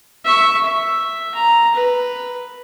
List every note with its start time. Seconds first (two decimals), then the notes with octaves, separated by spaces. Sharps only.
0.25 E5 C#6
0.65 E5
1.34 A#5
1.74 B4